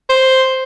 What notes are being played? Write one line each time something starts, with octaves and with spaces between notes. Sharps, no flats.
C5